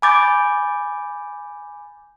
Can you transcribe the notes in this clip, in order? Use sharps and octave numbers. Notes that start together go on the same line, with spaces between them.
G#5 B5 D6 G6 A6